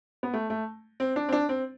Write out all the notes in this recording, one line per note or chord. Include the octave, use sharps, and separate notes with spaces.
B3
A3
A3
C4
D4
C4
D4
C4